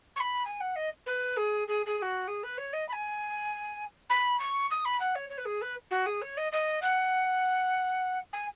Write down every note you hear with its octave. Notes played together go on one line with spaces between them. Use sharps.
C#6
B5
G#5
F#5
D#5
B4
G#4
G#4
G#4
G#4
F#4
G#4
B4
C#5
D#5
B5
G#5
B5
C#6
D#6
B5
F#5
C#5
C#5
B4
G#4
B4
F#4
G#4
C#5
D#5
D#5
F#5
G#5